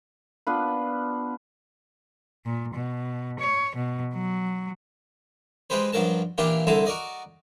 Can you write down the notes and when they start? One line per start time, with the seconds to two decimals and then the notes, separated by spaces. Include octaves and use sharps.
0.47 B3 D4 F4 B4
2.46 A#2
2.74 B2
3.39 C#5
3.76 B2
4.14 F#3
5.70 G#3 C4 G4 B4 C5
5.92 G2 F3 F#3 A#4 A5
6.38 A#2 E3 D4 F4 G4 A#4
6.67 C2 D3 E4 A5 A#5 C6
6.85 F#4 A#4 D5 D#5